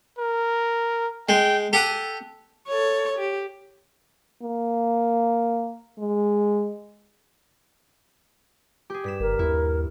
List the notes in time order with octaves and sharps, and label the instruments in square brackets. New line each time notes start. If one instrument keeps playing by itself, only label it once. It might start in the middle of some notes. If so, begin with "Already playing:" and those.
[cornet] A#4
[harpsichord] G#3 [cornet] G5
[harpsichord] G4 F#5 D#6 [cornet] A4
[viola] A4 C#5
G4
[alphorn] A#3
G#3
[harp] G4 G#4
G2 B6 E7
[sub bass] F#1 [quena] A#4
[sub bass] D#2 [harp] E4